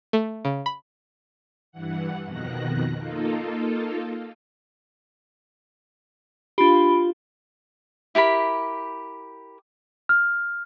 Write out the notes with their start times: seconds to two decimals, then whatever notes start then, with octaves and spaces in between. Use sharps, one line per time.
0.13 A3
0.45 C#3
0.66 B5
1.72 G2 E3 F#5
2.25 F2 B2 D#3 F#6 A#6
2.98 A#3 D#4 F4 A4
6.58 D4 F4 G4 B5
8.15 E4 G4 A#4 B5
10.09 F6